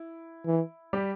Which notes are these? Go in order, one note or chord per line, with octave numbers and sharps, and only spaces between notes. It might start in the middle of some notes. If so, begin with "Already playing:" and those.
Already playing: E4
E3
G3 G4